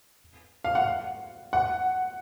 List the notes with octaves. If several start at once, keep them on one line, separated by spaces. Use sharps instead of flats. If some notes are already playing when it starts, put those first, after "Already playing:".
F5
F#5
F#5